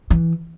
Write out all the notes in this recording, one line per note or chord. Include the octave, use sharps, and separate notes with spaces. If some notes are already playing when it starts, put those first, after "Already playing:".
E3